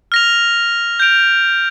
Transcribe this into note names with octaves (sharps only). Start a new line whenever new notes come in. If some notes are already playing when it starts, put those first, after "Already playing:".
F6 A#6 F7
G6 D7 F7